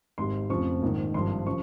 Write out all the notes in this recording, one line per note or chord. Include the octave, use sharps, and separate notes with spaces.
G#1 G#2 G3 C6
F1 F2 C#3 F3 C#6
A#1 G#2 D#3
G#1 G2 F3 C6
C#3 F3 C#6